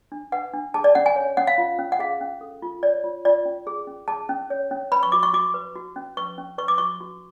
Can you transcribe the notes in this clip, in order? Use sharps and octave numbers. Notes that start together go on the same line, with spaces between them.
D4
B4 F#5
D4
G#4 A5
D5
C#4 F#5
G#5
C#5
C#4 F#5
F5
F4
C#4
F#5
G#4 F5
C#4
A4
F4
C#5 D5
F4
F4 D5
C#4
G#4
C#4
G#4 A5
C#4
C#5
C#4
B4 B5
C#6
F#4 D6
C#6
F#4 D6
B4
F#4
C#4
B4 C#6
C#4
B4 C#6
D6
F#4 C#6
F#4